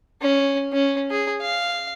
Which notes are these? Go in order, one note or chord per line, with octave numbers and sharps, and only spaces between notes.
C#4
C#4
G#4
F5